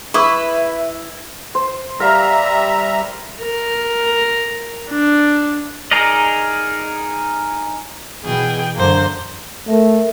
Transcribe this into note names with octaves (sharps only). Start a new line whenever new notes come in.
E4 G#4 B4 E5 C#6 D#6
C5
G3 A#4 E5 F5 A#5
A#4
D4
D#4 G#4 A#4 D5 D#5
B2 E3 G#4 G5
F#2 D3 A#3 C5
A3 A#4 E5